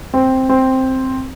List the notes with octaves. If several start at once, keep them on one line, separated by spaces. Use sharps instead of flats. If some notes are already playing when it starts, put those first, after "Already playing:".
C4
C4